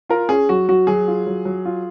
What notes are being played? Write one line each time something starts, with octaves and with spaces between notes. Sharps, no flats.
F4 A#4
C#4 G#4
F#3 F#4
F#3 F#4
F#3 G#4
F4
F#3
F#3
F4